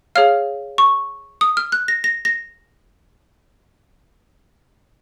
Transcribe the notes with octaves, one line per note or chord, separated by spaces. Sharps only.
G#4 C#5 F5 F6
C#6
D#6
F6
F#6
A#6
A#6
A#6